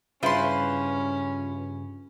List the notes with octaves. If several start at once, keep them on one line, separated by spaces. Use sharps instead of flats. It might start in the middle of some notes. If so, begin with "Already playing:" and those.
G2 C#3 C#4 E4 F4 B4 C5 C6